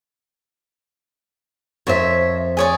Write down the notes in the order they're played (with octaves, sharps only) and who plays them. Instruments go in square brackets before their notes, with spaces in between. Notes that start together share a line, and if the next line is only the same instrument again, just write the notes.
[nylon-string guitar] F2 A#4 C5 [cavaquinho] C#5 E5
[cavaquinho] G#4 C#5 D5